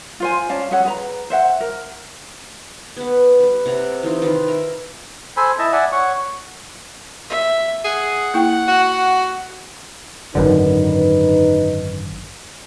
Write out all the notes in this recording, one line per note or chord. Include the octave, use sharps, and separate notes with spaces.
F4 C5 G#5
C#4 D5 F5 A5
C#4 G#4 A4 F#5
G#4 B4 A#5
C5 E5 F#5
A#4
B3 B4 F#5
G3 B4
C3 F#5 A#5
E3 D#4 F4
D#3 F4 B4
A#4 E5
A4 C5 G#5 B5
E4 D#5 E5 A5
D5 E5 F#5 G#5
C#5 F#5 C#6
E5
G#4 F#5
A#3 E4 G5
F#4
G#1 F#2 D3 D#4 B4